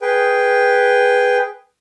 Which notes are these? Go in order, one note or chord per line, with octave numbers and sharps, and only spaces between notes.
G#4 B4 G5